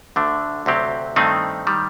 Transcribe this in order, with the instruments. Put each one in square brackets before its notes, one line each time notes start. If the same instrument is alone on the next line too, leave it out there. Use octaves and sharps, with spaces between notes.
[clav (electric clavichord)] D2 D3 A3 D4
D2 C3 F#3 C4 G4
G2 D#3 A3 C4 D#4
D#3 G3